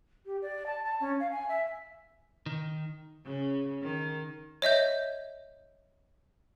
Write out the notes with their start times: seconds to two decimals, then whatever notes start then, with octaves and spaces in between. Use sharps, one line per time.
0.26 G4
0.42 D5
0.66 A5
0.84 A5
1.00 C#4
1.20 F5
1.32 G#5
1.49 E5
2.46 D#3
3.25 C#3
3.82 D#3
4.62 C#5 D#5 E5 G6